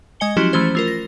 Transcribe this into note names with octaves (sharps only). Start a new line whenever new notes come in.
G#3 D#5 G#5 C#7 G7
F3 F#3 C#4 E4 F#4 G4
E3 F3 A3 C#4 C5
A3 F4 A#4
A#6